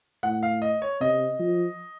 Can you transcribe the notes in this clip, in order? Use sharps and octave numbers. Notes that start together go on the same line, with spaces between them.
A2 F#5
F5
D#5
C#5
C3 D#5
F3